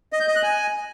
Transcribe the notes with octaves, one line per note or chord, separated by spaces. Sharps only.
D#5
G6
D#5
F#6
G#5